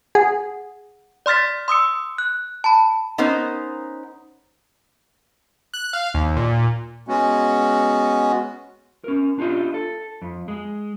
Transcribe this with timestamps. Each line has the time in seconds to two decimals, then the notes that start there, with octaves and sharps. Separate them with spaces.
0.15 G#4 F#5
1.26 D5 C6 F6 A6 B6
1.68 C6 D#6 E6 C#7
2.18 F#6
2.64 A5 B5
3.18 B3 C#4 D#4 A#4 C5
5.74 F#6
5.93 F5
6.14 D#2
6.36 A#2
7.08 G#3 B3 C#4 F#4
9.04 C#4 A#4
9.39 D4 F4 G4 D#5
9.74 A4
10.22 F2
10.48 G#3